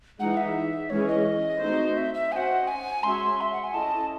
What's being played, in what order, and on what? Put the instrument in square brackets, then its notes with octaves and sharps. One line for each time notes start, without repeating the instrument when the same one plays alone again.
[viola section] E3 G#3 D#4 [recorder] F#5
[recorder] E5
[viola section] E3 G#3 C#4 G#4 [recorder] C#5
[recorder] D#5
[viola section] A3 C4 D#4 F#4 C5
[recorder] E5
E5
[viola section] C#4 F#4 C5 D#5 [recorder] F#5 G#5
[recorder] G#5
[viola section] G#3 C#4 F#4 C#5 E5 [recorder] C6
[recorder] E5
F#5
G#5
[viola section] C#4 E4 A4 D#5 [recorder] A5